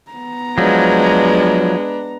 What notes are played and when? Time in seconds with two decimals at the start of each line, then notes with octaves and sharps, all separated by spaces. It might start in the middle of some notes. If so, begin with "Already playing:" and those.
0.11 B3 A#5
0.58 F3 F#3 G#3 D4 B4